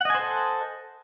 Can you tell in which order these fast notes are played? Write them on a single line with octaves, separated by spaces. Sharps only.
F#5 D#5 G#5 C5 A4